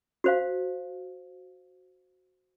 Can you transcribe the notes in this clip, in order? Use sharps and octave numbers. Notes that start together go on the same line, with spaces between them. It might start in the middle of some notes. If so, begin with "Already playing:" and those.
F#4 C5 F5